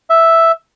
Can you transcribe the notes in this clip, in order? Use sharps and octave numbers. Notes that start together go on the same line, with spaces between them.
E5